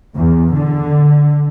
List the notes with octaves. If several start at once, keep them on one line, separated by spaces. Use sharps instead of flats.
E2
D3